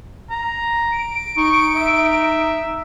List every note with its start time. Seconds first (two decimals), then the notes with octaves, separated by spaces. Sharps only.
0.30 A#5
0.92 D7
1.37 D#4 C#6
1.76 E5